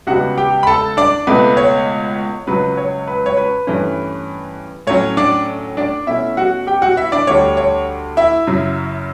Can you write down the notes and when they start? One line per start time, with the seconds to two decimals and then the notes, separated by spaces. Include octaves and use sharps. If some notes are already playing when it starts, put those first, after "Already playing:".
0.07 C#2 C#3 G3 B3 F#4 F#5
0.38 G4 G5
0.63 B5
0.67 A4 A5
0.97 D4 D5
1.27 C#2 B2 A3 B4
1.57 C#5
2.47 C#2 C#3 F#3 B4
2.77 C#5
3.07 B4
3.26 C#5
3.37 B4
3.67 G2 E3 A3 C#4
4.87 A2 F#3 C#4 C#5
5.17 D4 D5
5.77 D4 D5
6.07 B2 A3 C#4 E4 E5
6.37 F#4 F#5
6.67 G4 G5
6.82 F#4 F#5
6.97 E4 E5
7.12 D4 D5
7.27 D2 D3 G3 C#5
7.57 C#5
8.17 E4 E5
8.47 F#2 C#3 F#3